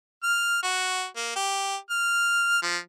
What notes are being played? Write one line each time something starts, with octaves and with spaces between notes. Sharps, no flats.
F6
F#4
A#3
G4
F6
F3